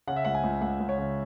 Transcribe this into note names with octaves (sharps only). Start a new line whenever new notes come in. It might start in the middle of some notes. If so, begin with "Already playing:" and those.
C#3 F#5
E5
C#2 F#5
G#5
C#2
C#2 F#5
C#2
C#5
C#3